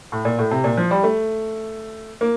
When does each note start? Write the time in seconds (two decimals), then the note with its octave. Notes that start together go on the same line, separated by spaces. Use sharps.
0.12 A2
0.25 A#2
0.39 A2
0.51 C3
0.64 A#2
0.77 F3
0.91 G3
1.03 A3
2.21 A#3